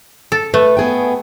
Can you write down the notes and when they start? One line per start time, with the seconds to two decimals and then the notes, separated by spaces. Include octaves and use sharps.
0.32 A4
0.54 A3 B4
0.77 B3 G#4 G5